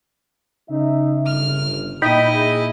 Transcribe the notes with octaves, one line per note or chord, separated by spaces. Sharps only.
C#3 D#4 E5
G1 F6
A#2 D#4 E4 D#5 G5 B5
G#4 E5